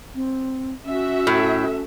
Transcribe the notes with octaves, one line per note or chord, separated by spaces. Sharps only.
C4
C#4 F#4 E5
A2